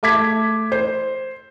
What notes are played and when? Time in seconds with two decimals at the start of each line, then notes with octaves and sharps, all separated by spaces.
0.03 A3 E5 D6 G#6 B6
0.72 C5